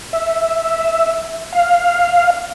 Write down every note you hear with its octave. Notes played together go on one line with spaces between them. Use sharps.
E5
F5